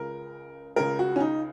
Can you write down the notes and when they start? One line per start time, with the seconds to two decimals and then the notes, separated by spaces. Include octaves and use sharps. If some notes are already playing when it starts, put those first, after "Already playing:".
Already playing: C#2 C#3 A#4
0.76 C#2 C#3 A#4
0.99 F#4
1.16 C#4
1.20 D#4